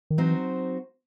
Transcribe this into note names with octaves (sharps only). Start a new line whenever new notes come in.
D#3
E3 F#3 C4 D#4 F#4 C5